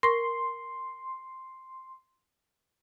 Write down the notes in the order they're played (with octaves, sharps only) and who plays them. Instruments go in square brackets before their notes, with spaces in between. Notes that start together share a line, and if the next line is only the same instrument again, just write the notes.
[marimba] A#4 C#6 [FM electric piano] C6